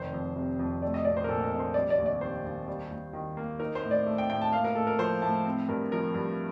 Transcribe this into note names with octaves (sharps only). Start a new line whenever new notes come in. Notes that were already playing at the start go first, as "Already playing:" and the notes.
Already playing: F1 D#3 C5
F2
C3
F2
A3 D5
D#5
A#1 D5
C5
A#4
A#2 A4
A#4
A#1
C5
G3 D5
D5
D#2
D5
D#3 C5
D#2
G3
D#2
D#3
A#3
D#4 A#4
C5
A2
D5
A3
G5
A2 G5
A5
A#3 F5
A#4
A2 A4
A#4
F3 C5
A2 A5
C4
G2 A#4
F3 A#4
G2